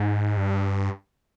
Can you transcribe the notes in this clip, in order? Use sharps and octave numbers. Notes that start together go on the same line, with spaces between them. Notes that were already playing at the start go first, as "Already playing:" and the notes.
Already playing: G#2
G2